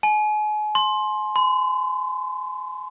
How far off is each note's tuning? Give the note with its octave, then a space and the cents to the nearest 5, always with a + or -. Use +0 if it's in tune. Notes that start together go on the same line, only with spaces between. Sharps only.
G#5 +35
C6 +15
C6 -45